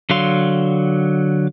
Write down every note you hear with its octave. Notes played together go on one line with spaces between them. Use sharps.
D3 F#3 F5 C6